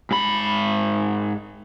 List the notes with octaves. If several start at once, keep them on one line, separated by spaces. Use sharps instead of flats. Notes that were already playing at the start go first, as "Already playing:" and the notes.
G#2 B5